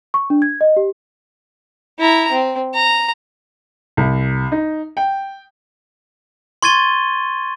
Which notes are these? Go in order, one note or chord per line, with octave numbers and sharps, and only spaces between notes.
C#6
D4
G#6
D#5
G4
E4 A#5
C4
A#5
C2
D#4
G5
C6 C#6 G#6 A6 D#7 G7